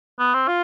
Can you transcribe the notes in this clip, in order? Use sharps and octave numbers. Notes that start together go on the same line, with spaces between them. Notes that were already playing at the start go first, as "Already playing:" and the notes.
B3
C4
F4